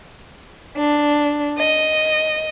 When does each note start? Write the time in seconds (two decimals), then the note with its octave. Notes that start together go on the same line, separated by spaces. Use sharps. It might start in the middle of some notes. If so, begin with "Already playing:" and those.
0.77 D4
1.58 D#5